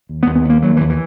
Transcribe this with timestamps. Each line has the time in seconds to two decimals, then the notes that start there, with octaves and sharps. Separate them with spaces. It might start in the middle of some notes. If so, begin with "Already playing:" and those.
0.09 D#2
0.23 B3
0.27 D#2
0.35 B3
0.45 D#2 A#3
0.62 D#2 F#3
0.77 D#2 E3
0.90 E3